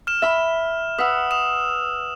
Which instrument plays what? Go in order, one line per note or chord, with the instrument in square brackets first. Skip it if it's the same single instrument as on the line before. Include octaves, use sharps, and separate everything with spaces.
[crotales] F6 E7
[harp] E5 B5
[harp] B4 F#5 [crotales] D#6 E6
[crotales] D#6 E7